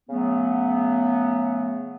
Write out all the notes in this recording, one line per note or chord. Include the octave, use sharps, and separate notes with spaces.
C#3 F#3 A3 B3